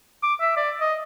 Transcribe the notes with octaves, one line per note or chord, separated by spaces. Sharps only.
D6
E5
D5
D#5